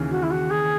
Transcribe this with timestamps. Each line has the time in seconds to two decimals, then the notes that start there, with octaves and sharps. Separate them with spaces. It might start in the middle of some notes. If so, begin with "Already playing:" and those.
Already playing: D#2 C#3 E3
0.10 F#4
0.23 E4
0.30 F#4
0.50 G#4